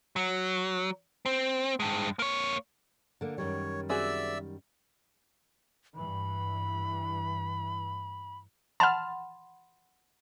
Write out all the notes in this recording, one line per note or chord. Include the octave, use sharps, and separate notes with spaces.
F#3
C4
G2 G#3
A#3 C#5
D3 A#3
F#2 D#3 G3 C#5
C4 F#4 G#4 D5 E5 E6
G2 E3 B5
F#5 A5 B5 C6 F6